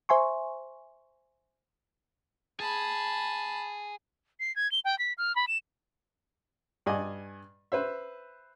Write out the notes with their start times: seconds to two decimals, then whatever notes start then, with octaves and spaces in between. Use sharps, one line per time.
0.09 C5 E5 G#5 C6 C#6
2.60 G#4 A5 B5
4.40 C7
4.56 G#6
4.72 G7
4.85 G5
4.99 B6
5.18 F6
5.36 B5
5.48 E7
6.86 G2 D5 D#5 G#5
7.72 B4 C5 E5